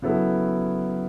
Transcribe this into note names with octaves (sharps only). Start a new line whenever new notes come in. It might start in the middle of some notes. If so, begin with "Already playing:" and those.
C#3 F#3 B3 E4 A4